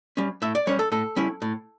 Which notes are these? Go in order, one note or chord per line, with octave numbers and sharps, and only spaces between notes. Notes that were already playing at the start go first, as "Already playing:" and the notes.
G3 C#4
A2 E5
D5
G3 C#4 C#5
A4
A2 A4
G3 C#4 E4
A2